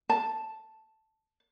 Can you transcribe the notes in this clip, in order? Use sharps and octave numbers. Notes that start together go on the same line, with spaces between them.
A5